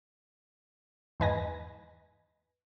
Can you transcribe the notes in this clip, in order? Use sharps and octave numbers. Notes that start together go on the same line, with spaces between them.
E2 G#2 B4 D#5 G#5 A#6